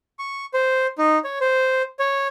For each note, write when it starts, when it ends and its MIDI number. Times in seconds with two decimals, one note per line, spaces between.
0.19 0.45 85
0.54 0.87 72
0.98 1.19 63
1.24 1.39 73
1.41 1.82 72
1.99 2.27 73